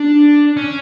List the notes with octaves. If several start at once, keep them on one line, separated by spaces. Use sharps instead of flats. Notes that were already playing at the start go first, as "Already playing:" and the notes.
Already playing: D4
C#4